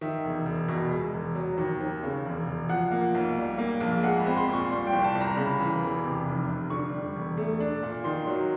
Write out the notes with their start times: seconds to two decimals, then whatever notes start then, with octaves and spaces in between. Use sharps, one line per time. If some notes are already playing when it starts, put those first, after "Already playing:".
0.01 D#3 E5
0.25 E1
0.46 E1
0.68 B2
0.91 G#3
1.14 E1
1.35 F#3
1.58 D#2
1.81 D#2
2.03 C#3
2.25 E1
2.47 E1
2.69 F3 F#5
2.91 A#3
3.15 B1
3.37 G3
3.58 A#3
3.81 A#1
4.03 G#3 F#5
4.20 B5
4.26 C4
4.36 C6
4.48 A#2
4.53 C#6
4.71 G3 C6
4.87 G5
4.93 C2
5.04 A5
5.15 C2
5.21 A#5
5.37 C#3 B5
5.60 E3
5.81 E1
6.05 C3
6.26 F1
6.48 F1
6.70 D3 C#6
6.94 G3
7.16 E1
7.38 A3
7.60 D4
7.83 A#2
8.04 D#3 C6
8.27 F#3